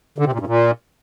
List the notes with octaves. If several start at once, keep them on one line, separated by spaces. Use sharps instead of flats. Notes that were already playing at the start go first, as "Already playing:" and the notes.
D3
C3
A#2
G2
A#2